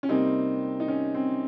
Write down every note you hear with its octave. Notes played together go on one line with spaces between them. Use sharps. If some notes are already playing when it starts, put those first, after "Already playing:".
C#4
C3 G3 A#3 C4 D#4
D#4
C#4
C4